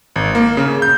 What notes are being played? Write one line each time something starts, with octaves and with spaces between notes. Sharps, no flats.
G#1
A#3
C#3
G6